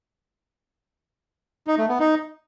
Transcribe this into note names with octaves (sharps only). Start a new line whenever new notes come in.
D#4
A3
B3
D#4